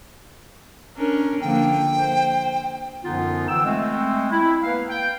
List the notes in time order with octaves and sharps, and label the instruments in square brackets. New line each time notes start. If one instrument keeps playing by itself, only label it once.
[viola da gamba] C#4 D4 A#4
[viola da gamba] D3 F3 A#3 [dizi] G5
[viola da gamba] C5
[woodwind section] F#2 D3 F3 B3 D#4 F4
D3 E3 G5 E6
G#3 A3 C4
E4
A#3 B3 B4 F5
G5